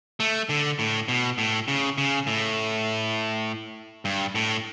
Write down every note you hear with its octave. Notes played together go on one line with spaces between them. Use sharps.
A3
D3
A2
B2
A2
C#3
C#3
A2
G2
A2